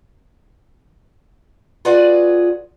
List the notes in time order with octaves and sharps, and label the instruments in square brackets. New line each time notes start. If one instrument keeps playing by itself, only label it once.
[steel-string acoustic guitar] F4 F#4 G#4 B4 D5 F#5